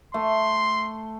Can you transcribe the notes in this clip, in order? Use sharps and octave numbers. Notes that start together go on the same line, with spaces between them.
A3 C6